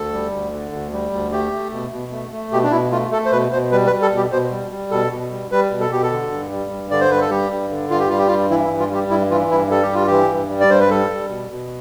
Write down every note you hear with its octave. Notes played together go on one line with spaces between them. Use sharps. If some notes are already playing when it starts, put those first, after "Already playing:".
Already playing: D2 A4
G3
D2
D3
D2
G3
D2
A3 G4
A3
B2
B2
A3
A3
B2 G4
D4
B2 E4
A3 F4
A3 A4
C5
B2 B4
B2 C5
G3 B4
B4
G3
A4
B2
G4
B2 C5
G3
G3
B2 A4
B2
G3
G3 B4
B2
A4
B2 G4
A4
D3
G2
G3
G2
D3 D5
C5
G2 B4
A4
G3 G4
G2
D3
G2 F4
G4
G3 F4
G4
F4
G2
E3 E4
E4
G2
F4
G3 G4
G2 E4
E3 F4
G2 E4
G3 A4
G4
G2 F4
E3 G4
G2
G3
D5
G2 C5
B4
G3 A4
G3
B2
B2